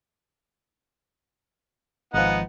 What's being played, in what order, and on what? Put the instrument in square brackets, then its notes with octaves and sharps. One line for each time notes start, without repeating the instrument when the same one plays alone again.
[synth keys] G#1 F3 [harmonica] B3 D#4 F#5